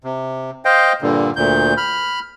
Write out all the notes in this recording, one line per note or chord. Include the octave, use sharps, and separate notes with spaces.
C3
C5 D#5 F5 G5
G2 A#2 D3
D2 A#2 G6
B5 F6